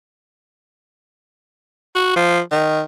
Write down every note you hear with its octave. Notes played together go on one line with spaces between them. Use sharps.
F#4
F3
D#3